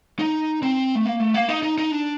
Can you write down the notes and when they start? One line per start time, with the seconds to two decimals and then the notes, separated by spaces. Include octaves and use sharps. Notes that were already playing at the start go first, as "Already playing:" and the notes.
0.19 D#4
0.62 C4
0.95 A3
1.05 A#3
1.19 A3
1.34 A#3
1.49 D#4
1.63 D#4
1.78 D#4
1.92 D4